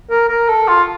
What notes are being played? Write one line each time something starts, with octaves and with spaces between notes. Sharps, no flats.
A#4
A#4
A4
F4